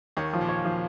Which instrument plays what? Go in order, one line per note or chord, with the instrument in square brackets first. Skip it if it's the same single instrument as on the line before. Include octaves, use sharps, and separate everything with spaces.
[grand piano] D#2 D#3 [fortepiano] C#5
[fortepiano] F3
[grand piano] A#2
[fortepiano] C#5
F3